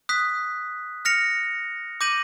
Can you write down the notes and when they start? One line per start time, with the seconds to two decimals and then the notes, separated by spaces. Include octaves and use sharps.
0.09 D#6 F#6 B6
1.05 F6 A#6 C#7 F7
2.01 D6 G6 A#6 D#7 F#7